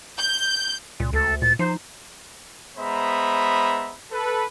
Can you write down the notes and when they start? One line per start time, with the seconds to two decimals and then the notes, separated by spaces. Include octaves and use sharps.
0.19 G6
1.00 C#2 A#2
1.13 D2 A4
1.42 A#2 A6
1.59 F3 D#4 C5
2.77 G#3 B3 C5 E5 A#5 B5
4.11 A4 B4